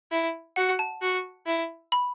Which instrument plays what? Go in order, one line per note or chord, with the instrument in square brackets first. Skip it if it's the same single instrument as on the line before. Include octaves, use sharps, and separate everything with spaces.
[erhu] E4
[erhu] F#4 [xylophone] F#5
[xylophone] A5
[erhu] F#4
E4
[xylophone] B5